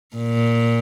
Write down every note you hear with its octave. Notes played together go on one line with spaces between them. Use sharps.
A#2